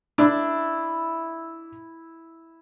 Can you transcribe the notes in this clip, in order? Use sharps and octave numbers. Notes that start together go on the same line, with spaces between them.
D4 E4